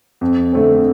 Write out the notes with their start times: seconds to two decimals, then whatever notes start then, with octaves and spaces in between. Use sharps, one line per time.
0.21 F2
0.53 D3 A3 C4